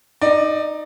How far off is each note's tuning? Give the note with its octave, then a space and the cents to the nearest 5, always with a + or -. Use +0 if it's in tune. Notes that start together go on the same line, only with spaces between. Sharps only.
D#4 +0 D5 +25